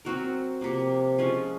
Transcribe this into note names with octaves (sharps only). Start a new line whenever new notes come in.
F#3 C4 F#4 A#4
C3 F3 A#3
F3 G#3 C#4 F4